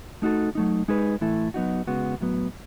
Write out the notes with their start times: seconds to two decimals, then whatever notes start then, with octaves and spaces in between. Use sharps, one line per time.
0.22 A3 D#4 F#4 A4
0.55 F#3 A3 D#4
0.88 G#3 D#4 G#4 B4
1.21 A2 E3 A3 E4 A4
1.54 F#3 B3 D#4 F#4
1.87 C#3 G#3 B3 F#4
2.21 A2 F#3 B3